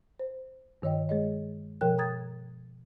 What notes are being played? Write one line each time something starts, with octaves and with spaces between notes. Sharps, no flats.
C5
G2 D#3 C#5 D#5 G5
G#3 G#4 C#5 D#5
B2 F3 A#4 C#5 G5 F#6
G5 A#5 D#6 G#6 A6